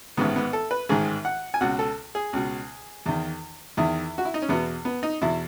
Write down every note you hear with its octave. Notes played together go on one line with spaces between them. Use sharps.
A1 G#2 D#3 B3
B3
A4
B4
A1 G#2 D#3 G#4
F#5
G#5
C#2 B2 F#5
A4
G#4
C#2 B2
E2 D#3
E2 D#3 E4
F#4
E4
D#4
C#4
E2 B2 B3
B3
D#4
E2 B2 E4